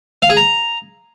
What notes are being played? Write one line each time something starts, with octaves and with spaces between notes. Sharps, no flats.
F5
G#4
A#5